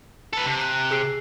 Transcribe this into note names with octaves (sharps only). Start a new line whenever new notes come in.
A4 B4
C3 A5
F#6
G#4 E6 C7